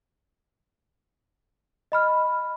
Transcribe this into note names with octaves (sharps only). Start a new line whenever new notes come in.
D#5 B5 F6